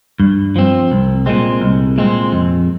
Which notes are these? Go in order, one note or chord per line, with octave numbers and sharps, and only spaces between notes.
G2
F3 C4
C2
A#2 G#3 C4
C2
A#2 G#3 C4
F2